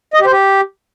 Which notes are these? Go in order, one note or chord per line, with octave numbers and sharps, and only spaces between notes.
D#5
G4
C5
G4